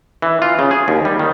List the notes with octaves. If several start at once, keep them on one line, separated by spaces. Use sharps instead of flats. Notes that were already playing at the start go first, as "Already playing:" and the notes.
E3
F4
C#3
G#4
D#2
G3
D#3